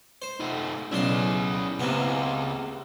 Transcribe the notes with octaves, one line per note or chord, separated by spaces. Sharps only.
C5
A3 D#4
B1 C#3 E4 D5 C6
C#2 C3 A#3 B3